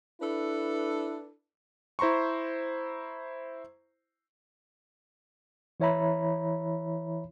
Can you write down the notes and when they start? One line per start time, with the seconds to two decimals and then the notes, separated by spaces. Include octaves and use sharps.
0.21 D4 E4 A4 B4
1.99 E4 C5 A#5 C6 C#6
5.80 E3 E4 C#5 E5 A#5 B5